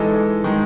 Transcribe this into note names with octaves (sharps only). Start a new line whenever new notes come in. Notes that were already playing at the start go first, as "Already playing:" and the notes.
Already playing: E3 G#3 D#4 A4
D#3 G#3